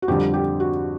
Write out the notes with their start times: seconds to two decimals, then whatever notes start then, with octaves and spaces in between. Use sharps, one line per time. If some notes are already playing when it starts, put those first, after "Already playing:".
0.02 F#4
0.08 F2 D3 G3 G4
0.34 G4
0.60 F#4